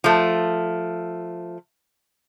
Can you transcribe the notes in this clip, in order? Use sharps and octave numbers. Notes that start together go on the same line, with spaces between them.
F3 A3